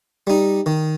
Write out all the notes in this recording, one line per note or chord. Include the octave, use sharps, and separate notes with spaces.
G3 D#4
D#3